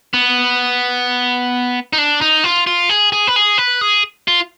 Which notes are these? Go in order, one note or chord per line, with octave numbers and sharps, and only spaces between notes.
B3
D#4
D4
D#4
F4
F4
G#4
G#4
B4
G#4
B4
G#4
F4